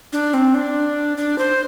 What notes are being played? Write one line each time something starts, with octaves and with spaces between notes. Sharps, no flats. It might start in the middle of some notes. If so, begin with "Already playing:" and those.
D4
C4
D4
D4
C5